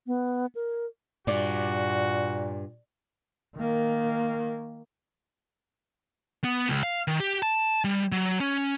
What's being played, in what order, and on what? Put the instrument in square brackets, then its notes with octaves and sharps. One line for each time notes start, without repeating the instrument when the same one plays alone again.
[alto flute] B3
A#4
[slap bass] G2 [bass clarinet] A#2 [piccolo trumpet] F#4 [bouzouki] D5
[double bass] D#3 A#3
[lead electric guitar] B3
C#2
F5
D#3
G4
A5
G3
F#3
C#4